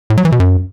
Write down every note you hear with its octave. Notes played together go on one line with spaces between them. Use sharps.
A2
F#3
E3
B2
F#2